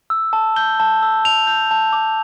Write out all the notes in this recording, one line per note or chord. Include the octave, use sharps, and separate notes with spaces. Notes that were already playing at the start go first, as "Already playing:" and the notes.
E6
A5
G6 G7
A5
E6
A5 F7
G6
A5
D6